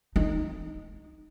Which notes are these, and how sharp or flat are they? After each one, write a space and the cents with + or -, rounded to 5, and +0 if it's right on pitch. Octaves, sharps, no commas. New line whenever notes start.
D#4 +0